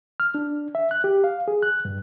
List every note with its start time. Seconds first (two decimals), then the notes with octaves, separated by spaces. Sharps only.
0.20 F6
0.35 D4
0.75 E5
0.91 F#6
1.04 G4
1.24 F5
1.48 G#4
1.62 F#6
1.85 G2